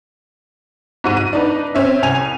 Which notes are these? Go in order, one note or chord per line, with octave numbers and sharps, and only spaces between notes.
G#2 F#4 D#7
D#7
D4 D#4 B4
C4 C#4 E5
C2 G#5 F7